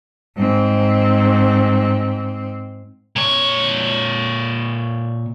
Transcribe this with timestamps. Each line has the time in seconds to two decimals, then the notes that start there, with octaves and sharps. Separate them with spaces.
0.37 G#2 C4
3.16 A#2 C#5